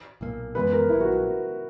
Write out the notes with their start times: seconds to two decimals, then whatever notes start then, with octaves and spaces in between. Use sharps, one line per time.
0.21 B1 A#2 A#3
0.55 F#2 E3 G#3 B3 B4
0.72 A#4
0.89 A#1 A#2 F#3 E4
1.01 F#4